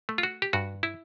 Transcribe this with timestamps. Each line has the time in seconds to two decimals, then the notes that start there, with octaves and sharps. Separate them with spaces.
0.09 A3
0.18 F4
0.23 F#4
0.42 G4
0.53 G2 F#4
0.83 E4